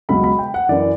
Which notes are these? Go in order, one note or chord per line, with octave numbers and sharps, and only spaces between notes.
C#2 B2 F#3 B5
B5
G5
F#5
F#2 E3 D5